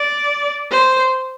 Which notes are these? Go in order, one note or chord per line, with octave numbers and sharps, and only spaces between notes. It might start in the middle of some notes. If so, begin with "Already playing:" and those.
Already playing: D5
C5